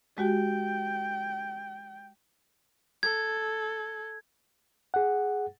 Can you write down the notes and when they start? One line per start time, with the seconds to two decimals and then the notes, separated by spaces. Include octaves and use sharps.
0.18 G#3 F#4 G4 G5
3.03 A4 G#6
4.94 G#4 F#5